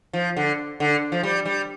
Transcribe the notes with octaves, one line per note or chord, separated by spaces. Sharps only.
F3
D3
D3
F3
G3
G3